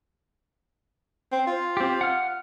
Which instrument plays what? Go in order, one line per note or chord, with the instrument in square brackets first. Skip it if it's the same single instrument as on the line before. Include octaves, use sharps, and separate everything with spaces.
[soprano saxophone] C4
F4
[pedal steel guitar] C4 G4
F#5 F6